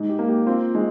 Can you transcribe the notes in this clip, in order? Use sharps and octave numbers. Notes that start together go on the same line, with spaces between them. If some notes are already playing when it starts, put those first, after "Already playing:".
Already playing: G#2
G4
A#3
G4
C4 F4
G#3